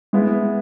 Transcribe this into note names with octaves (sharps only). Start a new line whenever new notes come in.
G#3 B3 E4